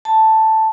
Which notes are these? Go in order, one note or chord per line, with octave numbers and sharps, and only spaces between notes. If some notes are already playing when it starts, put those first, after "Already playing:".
A5